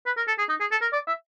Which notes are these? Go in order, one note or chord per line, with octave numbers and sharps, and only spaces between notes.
B4
A#4
A4
G#4
D#4
G#4
A4
A#4
D5
E5